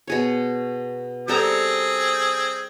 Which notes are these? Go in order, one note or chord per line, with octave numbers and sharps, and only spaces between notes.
B2 G#4 C#5
G3 C4 G#4 A4 A#5